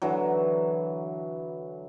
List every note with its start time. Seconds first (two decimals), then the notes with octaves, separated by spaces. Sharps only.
0.02 D3 E3 F#3